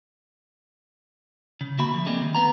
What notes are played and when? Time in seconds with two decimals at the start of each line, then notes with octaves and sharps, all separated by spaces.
1.61 C#3
1.79 D3 A#3 F#4 E5 B5
1.94 F3
2.06 D3 G3 G#3 A#3 C4
2.22 D#3
2.35 D2 B3 A#5